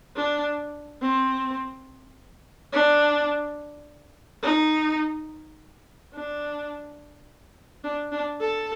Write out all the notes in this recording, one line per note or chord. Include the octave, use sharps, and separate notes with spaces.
D4
C4
D4
D#4
D4
D4
D4
A4